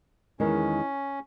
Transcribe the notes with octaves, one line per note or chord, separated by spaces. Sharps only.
E2 D#3 G#3 C#4 D#4 A#4